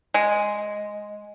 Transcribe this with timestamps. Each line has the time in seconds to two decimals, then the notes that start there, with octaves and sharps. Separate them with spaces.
0.14 G#3